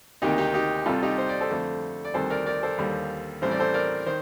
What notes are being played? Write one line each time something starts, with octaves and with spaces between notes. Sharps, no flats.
D2 C3 D#3 A#3 D#4 G4
D#4 G4
D#4 G4
C2 C3 G3 F4 A4
D#4 G4
C5
D5
A4 C5
F2 D3 A3
D5
D2 C3 D#3 G3 A4 C5
A#4 D5
A#4 D5
A4 C5
D#2 D3 G3 A#3
A1 A2 G3 C4 C5
D5
A4 C5
A#4 D5
D#3 C5